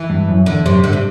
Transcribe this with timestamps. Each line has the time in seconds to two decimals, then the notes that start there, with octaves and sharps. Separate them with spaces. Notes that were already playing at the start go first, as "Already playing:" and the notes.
Already playing: E3
0.10 G2
0.28 F#2
0.46 E2 D3
0.65 F#2 C3
0.84 G2 D3
0.93 C3